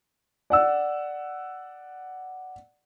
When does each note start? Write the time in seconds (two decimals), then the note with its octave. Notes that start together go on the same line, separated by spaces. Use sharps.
0.50 D5 F#5 E6